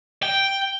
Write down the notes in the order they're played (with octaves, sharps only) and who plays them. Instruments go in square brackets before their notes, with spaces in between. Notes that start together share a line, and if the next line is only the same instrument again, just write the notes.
[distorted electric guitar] G5